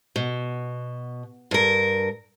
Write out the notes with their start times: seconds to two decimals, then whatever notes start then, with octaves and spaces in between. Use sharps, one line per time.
0.16 B2
1.51 G2 A#4